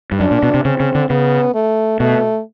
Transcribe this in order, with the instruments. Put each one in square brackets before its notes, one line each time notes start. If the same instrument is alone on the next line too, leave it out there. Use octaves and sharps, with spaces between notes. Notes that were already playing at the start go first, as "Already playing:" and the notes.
[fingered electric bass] G2
[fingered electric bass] F#2 [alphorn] D4
[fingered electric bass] A#2
B2
C3
[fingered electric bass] C#3 [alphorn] C4
[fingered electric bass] C#3
D3
[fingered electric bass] C#3 [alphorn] B3
[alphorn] A3
[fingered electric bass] B2 [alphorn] A3